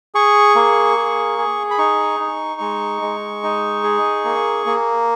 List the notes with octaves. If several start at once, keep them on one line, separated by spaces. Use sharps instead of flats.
G#4 C#6
A#3
G#4
G#4
B5
D#4 C#6
D#4
G#3
G#3
D#4
G#4
A#3
A#3